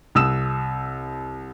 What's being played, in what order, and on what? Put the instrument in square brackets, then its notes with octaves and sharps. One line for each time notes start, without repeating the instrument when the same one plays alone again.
[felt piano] C2 D#6 E6 E7